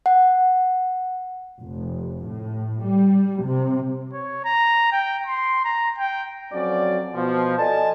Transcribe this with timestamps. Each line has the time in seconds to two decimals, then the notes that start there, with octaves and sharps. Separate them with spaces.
0.06 F#5
1.61 F1
2.27 A2
2.84 G3
3.45 C3
4.13 C#5
4.45 A#5
4.92 G5
5.27 C6
5.65 A#5
5.98 G5
6.53 F2 F#3 C4 C#4 D5
7.15 B2 F3
7.59 A4 D5 D#5 G#5 A5